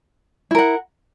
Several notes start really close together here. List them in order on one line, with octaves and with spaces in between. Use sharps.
E4 A#4 F#5